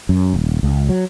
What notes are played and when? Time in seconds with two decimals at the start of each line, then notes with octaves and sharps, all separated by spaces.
0.09 F#2
0.34 D#1
0.63 C#2
0.89 F#3